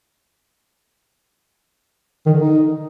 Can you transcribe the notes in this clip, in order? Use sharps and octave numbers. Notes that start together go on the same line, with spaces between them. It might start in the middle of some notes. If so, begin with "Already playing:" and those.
D#3
D3
D#4